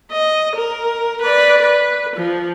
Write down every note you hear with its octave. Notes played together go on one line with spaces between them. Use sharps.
D#5
A#4
B4 D5
B4
F3